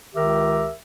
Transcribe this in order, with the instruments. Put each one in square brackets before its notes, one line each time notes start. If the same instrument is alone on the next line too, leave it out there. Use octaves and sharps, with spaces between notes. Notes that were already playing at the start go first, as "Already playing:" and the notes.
[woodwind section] C#2 D#3 G4 A#4 E5